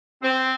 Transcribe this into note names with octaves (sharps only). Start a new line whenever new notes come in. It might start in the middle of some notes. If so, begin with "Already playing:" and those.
C4